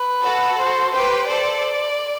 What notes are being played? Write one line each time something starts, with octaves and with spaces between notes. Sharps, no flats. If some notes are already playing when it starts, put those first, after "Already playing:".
Already playing: B4
F#4 A4
C5
G4 B4 C5
A4 C5 D5